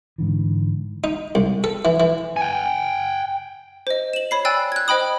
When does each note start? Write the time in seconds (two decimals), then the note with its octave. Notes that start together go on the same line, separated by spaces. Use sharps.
0.18 G#2 D3 E3
1.04 D#4
1.35 C2
1.64 A4
1.85 E3
2.00 E3
2.37 G5 G#5
3.87 C5 D#5
4.13 E7 F#7
4.31 C#5 B5 C7
4.45 D5 G5 G#5 E6 F#6 A6
4.72 F#6 G#6
4.88 C5 D#5 G5 B5 D#6